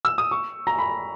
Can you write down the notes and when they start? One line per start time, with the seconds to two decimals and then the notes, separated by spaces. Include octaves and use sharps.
0.05 E6
0.18 D#6
0.31 C#6
0.67 A#5
0.79 B5